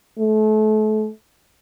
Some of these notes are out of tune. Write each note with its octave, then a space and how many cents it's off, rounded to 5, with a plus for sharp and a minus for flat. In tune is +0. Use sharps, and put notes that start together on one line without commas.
A3 -35